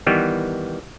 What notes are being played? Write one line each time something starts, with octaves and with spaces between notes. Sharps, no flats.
D#3 E3 G3 B3